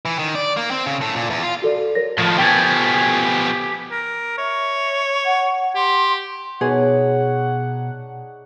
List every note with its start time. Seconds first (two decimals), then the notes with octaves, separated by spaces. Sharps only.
0.05 E3
0.19 D#3
0.35 D5
0.57 A#3
0.71 C4
0.86 C#3
1.01 A2
1.16 A#2
1.30 E2
1.43 F4
1.62 F#4 A4 D5
1.95 A#4 C#5 A#6
2.18 A2 D#3 F3
2.38 B2 F3 G4 G5 G#5 A6
3.91 A#4
4.38 C#5 E5
5.25 F#5
5.76 G4 C6
6.61 B2 D4 D#4 G#4 C#5 F#5